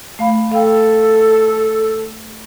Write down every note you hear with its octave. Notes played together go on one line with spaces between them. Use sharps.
A3 F5 B5
A4 F5 G5